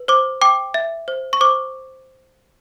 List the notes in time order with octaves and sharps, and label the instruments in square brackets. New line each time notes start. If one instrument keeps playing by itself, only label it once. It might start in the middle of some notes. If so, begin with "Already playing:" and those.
Already playing: [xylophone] B4
C5 D6
G5 D6
E5
C5
C#6
C5 D6